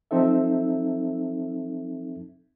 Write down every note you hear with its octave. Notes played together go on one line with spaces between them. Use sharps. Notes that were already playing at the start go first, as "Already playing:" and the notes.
F3 C4 D#4 A4 E5